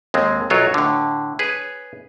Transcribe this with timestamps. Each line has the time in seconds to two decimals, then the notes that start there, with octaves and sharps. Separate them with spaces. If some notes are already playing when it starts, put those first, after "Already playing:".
0.14 D#2 G#3 C4
0.50 B1 F#2 F#3 F4 C#5 D#5
0.74 A2 D3
1.39 G#4 B4 C#5